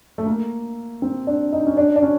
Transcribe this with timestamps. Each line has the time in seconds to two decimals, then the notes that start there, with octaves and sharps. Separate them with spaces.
0.18 A3
0.27 A#3
1.02 C4
1.27 D4
1.52 D#4
1.67 C#4
1.77 D4
1.96 D4
2.02 C#4